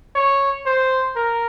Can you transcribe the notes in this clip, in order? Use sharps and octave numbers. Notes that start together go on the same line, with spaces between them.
C#5
C5
A#4